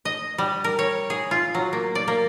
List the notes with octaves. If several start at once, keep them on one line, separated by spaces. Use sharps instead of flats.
D#5
G3
A#4
C#5
G#4
F4
F#3
A#3
D5
A#3